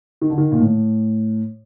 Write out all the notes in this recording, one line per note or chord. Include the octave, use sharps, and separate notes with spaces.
D#3
D3
D#3
A#2
A2